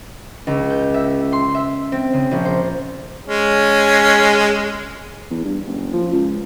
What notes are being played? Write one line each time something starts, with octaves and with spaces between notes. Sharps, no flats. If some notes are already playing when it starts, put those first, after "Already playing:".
C#2
G6
E5
C6
E5
C4
C#3
A#1
C5
G#3 C#4
E2
G2
F#1
F3
C#2